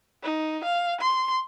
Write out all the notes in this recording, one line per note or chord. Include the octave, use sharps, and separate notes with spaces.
D#4
F5
C6